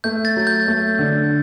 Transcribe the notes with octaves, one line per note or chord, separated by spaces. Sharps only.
A3 G6
A6
F#3
G6
A3
D3